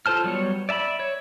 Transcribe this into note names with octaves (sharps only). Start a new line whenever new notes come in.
F4 A4 C5 A5 F6
F#3 G3 B3 C#5
D5 E5 A5 B5
C#5